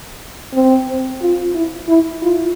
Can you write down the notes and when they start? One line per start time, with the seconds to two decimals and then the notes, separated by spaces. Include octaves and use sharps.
0.54 C4
1.21 F4
1.54 E4
1.88 E4
2.22 F4